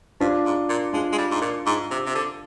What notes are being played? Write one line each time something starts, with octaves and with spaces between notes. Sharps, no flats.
G2 D4 F4
G#2
A#2
G#3 D4 F4
G#3
G3
G#2
A#2
G#2
C3
C3
D3